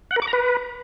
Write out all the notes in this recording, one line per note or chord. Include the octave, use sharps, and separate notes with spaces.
F#5
A#4
D6
A#5
B4